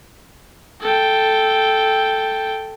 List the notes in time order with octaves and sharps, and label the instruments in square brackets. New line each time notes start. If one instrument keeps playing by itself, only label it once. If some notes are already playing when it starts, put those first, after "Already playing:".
[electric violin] A4 G5